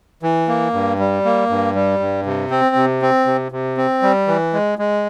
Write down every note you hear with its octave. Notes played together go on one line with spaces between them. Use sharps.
E3
A#3
G2
G3
A#3
G2
G3
G2
C3
C4
C3
C4
C3
C3
C4
G3
E3
G#3
G#3